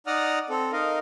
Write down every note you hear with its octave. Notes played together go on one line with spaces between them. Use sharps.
D#4 D5 F#5 A#5 D#6 F6
C4 A4
D#4 A#4 D#5 F5